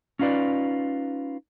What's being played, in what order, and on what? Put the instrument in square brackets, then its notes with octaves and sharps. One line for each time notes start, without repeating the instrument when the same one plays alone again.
[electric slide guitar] C#4 D#4 F4 B4 D5